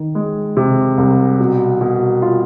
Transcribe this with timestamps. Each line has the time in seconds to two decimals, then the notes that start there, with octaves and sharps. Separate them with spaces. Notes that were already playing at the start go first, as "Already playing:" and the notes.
Already playing: D#3
0.15 G#3
0.57 C3
0.98 C2
1.40 B2
1.81 B2
2.22 F4